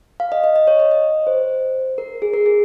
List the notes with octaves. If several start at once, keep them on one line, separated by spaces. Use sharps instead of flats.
F5
D#5
D#5
D#5
C#5
D#5
D#5
C5
A#4
G#4
A#4
G#4